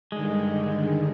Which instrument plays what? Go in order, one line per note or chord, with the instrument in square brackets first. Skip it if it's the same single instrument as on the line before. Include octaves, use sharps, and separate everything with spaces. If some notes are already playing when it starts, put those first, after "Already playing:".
[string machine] G2 D3 D#3 [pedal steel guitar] G#3